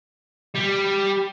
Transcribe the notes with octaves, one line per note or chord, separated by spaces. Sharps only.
G3